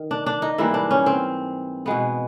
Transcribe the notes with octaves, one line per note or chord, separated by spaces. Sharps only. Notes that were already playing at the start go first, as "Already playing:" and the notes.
Already playing: D#3
D4
D4
D#4
G#2 E3 G3 A#3 E4
D4
C#4
C4
B2 G#3 B3